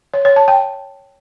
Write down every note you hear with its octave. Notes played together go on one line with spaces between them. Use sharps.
C#5
C#5
A5
G5